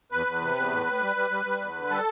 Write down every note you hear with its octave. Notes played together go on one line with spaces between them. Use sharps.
E2 B4
E2
C3
E2
A2
A2
G3
G3
G3
G3
E2
D3
G3 A4